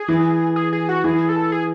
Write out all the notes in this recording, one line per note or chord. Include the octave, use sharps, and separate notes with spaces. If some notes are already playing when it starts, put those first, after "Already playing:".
Already playing: G#4
E3
G#4
G#4
F#4
E3 G#4
A4
G#4